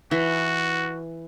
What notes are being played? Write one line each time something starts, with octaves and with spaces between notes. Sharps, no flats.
E3 F#4